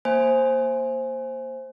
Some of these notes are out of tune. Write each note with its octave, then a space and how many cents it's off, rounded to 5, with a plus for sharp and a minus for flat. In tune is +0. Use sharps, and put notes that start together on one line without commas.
A#3 +0 C5 +10 G#5 +0